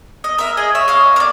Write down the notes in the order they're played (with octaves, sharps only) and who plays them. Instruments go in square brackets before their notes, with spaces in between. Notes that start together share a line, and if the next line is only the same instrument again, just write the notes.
[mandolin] D#5
A#4 E5
[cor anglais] G#4 [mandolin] D#5
[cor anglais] C#5 [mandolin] E5
[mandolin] D#5 F5
A#4 D5